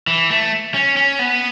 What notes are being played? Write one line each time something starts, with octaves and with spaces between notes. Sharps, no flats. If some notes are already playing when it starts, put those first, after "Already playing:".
E3
A3
C#4
C#4
B3